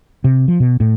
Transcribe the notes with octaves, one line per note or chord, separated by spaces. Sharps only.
C3
F3
B2
A2